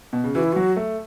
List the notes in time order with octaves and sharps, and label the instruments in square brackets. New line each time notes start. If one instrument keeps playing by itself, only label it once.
[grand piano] B2
C#3
[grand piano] E3 [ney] F#4
[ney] E4
[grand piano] F#3 [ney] F#4
[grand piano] A3